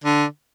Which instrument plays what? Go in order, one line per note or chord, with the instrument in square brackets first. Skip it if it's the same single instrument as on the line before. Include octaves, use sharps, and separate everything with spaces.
[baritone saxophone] D3